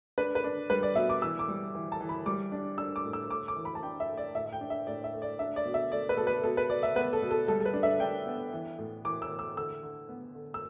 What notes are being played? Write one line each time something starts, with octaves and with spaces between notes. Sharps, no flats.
D4 B4
B4
D4
G3 B4
D5
B2 E5
D6
E3 E6
D6
G3
E3
A5
E3
B5
G3 D6
D4
D4 E6
D6
A2
E6
A3 D6
D6
E3
B5
A5
D4 G5
E5
A3
D5
A2 E5
E5
G5
D4
E5
A2 D5
E5
A3
D5
D4 E5
D5
B2
E5
A3 D5
B4
B2 A4
B4
B2 A4
B4
B2 D5
E5
B3 B4
A4
B2
A4
G3 A4
A4
B4
D4
E5
D4 G5
B3
E3
A2
E3 D6
E6
E3
E6
D3 E6
D3
B3
D3
E6